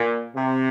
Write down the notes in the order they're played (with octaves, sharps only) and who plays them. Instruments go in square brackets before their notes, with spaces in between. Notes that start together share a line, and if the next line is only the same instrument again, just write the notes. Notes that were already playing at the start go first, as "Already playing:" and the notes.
Already playing: [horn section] A#2
C3